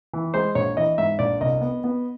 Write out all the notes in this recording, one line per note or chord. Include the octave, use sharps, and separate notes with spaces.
E3
G#3 C5
A#1 C#5
E3 D#5
G#2 E5
A#1 D5
C2 D#5
B3
B3